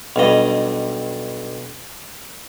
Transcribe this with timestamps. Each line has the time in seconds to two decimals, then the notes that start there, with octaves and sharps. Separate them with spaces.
0.16 B1 G2 D#5